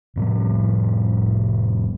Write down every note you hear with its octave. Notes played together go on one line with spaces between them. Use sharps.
F1 A2 F3 G3